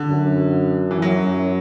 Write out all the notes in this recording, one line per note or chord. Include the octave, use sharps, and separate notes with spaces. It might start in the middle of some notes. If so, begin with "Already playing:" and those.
Already playing: D3
F#2
E3
F#2 F#3